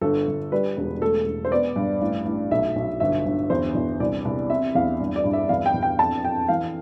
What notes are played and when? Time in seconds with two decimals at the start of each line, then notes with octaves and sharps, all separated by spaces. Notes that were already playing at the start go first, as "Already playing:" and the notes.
0.01 G1 A4
0.27 G1
0.52 G3 B4
0.77 E1
1.01 A3 A4
1.26 E1
1.45 C5
1.51 B3 D5
1.76 G2
2.02 A1
2.26 A1
2.51 B1 E5
2.76 B1
3.00 G1 E5
3.26 G1
3.50 E2 C5
3.75 E2
4.00 C2 D5
4.25 C2
4.50 C4 E5
4.75 E2 F5
5.00 G2
5.16 D5
5.24 G2
5.33 E5
5.49 E2 F5
5.66 G5
5.74 E2
5.83 G5
5.99 F2 A5
6.24 F2 G5
6.49 E3 F5